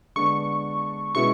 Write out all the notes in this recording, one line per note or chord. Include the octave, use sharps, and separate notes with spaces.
D3 G#3 B3 D4 C#6
B2 G#3 C#4 E4 B4 C#6